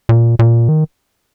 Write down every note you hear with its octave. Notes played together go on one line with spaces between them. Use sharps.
A#2
A#2
D#3